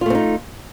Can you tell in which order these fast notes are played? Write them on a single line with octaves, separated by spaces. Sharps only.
F4 A3 C4 D#4